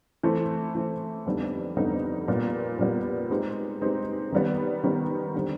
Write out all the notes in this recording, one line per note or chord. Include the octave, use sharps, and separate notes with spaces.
E3 A3 C4
E3 A3 C4
F2 D3 G3 B3 D#4
F2 D3 G3 B3 D#4
A#2 G3 B3
A#2 G3 B3
G#3 C4 D#4 G4 B4
G#3 C4 D#4 G4 B4
D#3 G3 B3
D#3 G3 B3
D3 G3 C4